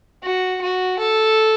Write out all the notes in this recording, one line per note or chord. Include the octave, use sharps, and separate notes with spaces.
F#4
F#4
A4